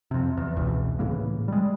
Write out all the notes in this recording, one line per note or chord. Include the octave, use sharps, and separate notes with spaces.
F2 C3
E2
F1 C#2 B2 E3
A2 C#3 E3 A#3
G3 G#3